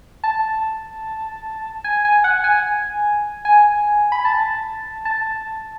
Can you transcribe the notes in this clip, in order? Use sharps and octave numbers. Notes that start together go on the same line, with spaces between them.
A5
G#5
G#5
F#5
G#5
G#5
B5
A5
A5